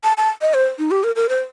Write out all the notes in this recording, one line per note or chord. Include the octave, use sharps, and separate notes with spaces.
A5
A5
D#5
C5
D#4
G4
A#4
A#4
C5